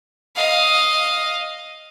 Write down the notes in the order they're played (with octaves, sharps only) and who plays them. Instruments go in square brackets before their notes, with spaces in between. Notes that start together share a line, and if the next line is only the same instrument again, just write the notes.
[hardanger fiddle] D#5 F5